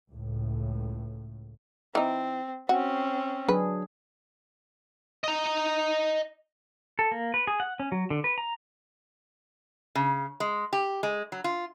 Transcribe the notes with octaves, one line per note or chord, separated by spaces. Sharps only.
C#2 A2
E3 C4 D#4
C4 C#4 F#4
F#3 D4 G#4 B4
D#5 A#5
A4
A#3
B4
G#4
F#5
C#4
F#3
D3
B4
A#5
C#3
G#3
G4
G#3
F#3
F4